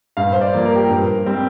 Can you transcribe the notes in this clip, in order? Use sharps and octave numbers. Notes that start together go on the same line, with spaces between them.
G2 F5
C5
D5
F3 A#3
A#4
G4
A#4
G2
G3 C4